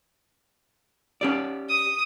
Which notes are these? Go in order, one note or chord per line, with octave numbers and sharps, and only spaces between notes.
C#4 G4 D5
D#6